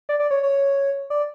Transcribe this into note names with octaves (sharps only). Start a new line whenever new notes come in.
D5
D5
C#5
C#5
D5